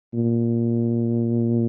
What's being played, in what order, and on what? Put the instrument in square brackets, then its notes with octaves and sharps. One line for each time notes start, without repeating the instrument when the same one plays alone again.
[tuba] A#2